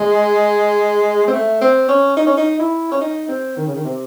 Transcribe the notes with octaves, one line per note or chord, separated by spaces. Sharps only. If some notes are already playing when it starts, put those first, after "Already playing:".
Already playing: G#3
C4
A3
C4
C#4
D#4
C#4
D#4
E4
C#4
D#4
C4
D#3
C#3
D#3
C3